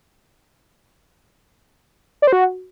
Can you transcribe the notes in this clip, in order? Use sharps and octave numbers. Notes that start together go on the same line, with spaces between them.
D5
C5
F#4